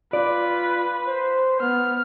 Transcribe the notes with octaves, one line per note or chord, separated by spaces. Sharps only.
F4 B4 D5
C5
B3 F6